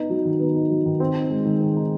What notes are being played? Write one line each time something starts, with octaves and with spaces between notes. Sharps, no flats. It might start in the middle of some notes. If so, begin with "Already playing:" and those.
Already playing: B3 D#4
F#3
D#3
B3
D#4
F#3
D#3
C4
D#4
G#3
D#3
C4
D#4